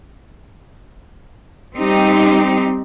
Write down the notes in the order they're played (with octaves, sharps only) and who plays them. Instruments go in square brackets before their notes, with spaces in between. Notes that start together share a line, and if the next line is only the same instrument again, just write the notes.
[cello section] G3 C4 D#4 G4